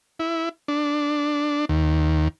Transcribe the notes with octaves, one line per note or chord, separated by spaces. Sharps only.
E4
D4
D#2